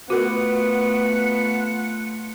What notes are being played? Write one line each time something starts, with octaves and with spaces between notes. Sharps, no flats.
A3 B3 F4 F#4 A#4 B4 F#5